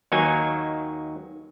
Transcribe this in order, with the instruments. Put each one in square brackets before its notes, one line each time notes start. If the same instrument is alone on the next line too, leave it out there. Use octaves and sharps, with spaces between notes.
[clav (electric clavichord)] D#2 D#3 F#3 A#3 D#4 G#5